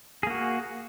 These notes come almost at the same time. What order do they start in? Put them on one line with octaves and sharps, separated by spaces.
G#4 A#3 F#4